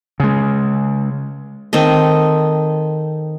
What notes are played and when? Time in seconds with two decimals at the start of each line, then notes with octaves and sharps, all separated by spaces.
0.20 C#3 G#3
1.73 D#3 C4 A4 D#5